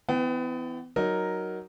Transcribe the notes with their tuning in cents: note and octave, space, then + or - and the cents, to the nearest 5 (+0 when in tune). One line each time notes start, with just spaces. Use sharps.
E3 +0 B3 +35 G5 +0
F#3 +10 D#4 +0 A#4 +0